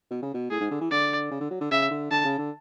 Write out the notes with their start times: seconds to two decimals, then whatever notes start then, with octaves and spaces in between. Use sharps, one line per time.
0.11 B2
0.22 C#3
0.34 B2
0.50 A2 G#4
0.61 G#2
0.71 D3
0.81 E3
0.91 D3 D5
1.31 C#3
1.41 D3
1.51 F#3
1.61 D3
1.71 C#3 E5
1.91 D3
2.11 D3 A5
2.25 C#3
2.38 D3